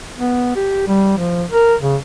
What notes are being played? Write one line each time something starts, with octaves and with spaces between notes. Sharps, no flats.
B3
G4
G3
F3
A#4
C#3